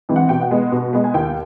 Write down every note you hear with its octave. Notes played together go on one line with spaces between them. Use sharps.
E3 G#3 C4
F#5
B2 G5
F#5
G#3 B3
B2
G#3 B3
G#5
D#2 G5